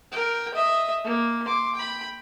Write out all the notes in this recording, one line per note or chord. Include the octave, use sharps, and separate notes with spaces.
A#4 G5
D#5 E5
A#3
C6 D6
G5 B5